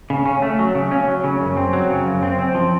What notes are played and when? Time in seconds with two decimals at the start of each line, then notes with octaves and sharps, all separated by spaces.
0.10 C#3
0.26 C#4
0.42 A3
0.59 F#3
0.75 C#3
0.91 C#4
1.08 F#3
1.24 C#3
1.40 F#2
1.57 C4
1.73 F#3
1.90 C#3
2.06 F#2
2.23 C4
2.39 C4
2.55 F3